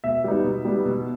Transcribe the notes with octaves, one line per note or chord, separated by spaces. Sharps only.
B2 E5
G3 B3 D#4
B2
G3 B3 D#4
B2